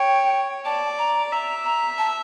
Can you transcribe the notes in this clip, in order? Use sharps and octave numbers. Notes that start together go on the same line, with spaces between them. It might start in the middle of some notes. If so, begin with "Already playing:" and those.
Already playing: C#5 G5
D5 A5
A#5
E5 A#5
A#5
A5